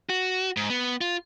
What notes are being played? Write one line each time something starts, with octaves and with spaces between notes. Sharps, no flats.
F#4
G#2
B3
F4